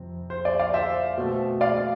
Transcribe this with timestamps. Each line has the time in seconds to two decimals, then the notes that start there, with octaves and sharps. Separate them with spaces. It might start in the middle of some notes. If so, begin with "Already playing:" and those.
Already playing: F2 C3 C4
0.30 C5
0.45 D5
0.59 D5 F5
0.74 C5 E5
1.17 B2 A3 C4
1.61 D5 F5